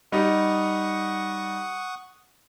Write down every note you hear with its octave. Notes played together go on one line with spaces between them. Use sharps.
G3 D#4 F#5 C#6 D#6